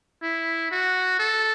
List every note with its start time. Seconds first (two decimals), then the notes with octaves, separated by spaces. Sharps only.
0.23 E4
0.72 F#4
1.20 A4